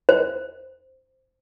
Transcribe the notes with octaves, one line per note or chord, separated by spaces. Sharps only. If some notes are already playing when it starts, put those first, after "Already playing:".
C5